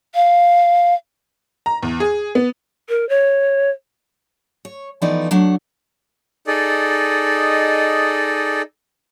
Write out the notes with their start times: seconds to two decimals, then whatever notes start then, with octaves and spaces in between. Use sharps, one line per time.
0.15 F5
1.66 A#5
1.83 E2
2.00 G#4
2.35 B3
2.89 A#4
3.09 C#5
4.65 C#5
5.02 E3 F3 A3 B3 D#4 D5
5.31 F#3 A3 D4 F#5
6.47 D#4 G#4 A4 D5 D#5